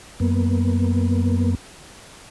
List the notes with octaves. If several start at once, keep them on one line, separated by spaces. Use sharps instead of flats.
F#2 A#3 B3